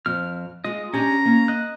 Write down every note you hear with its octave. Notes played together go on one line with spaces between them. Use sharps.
F2 F6
G#3 F4 D#5
C#4 D4 G4 G#5 A#5
A#3
D#5 F#6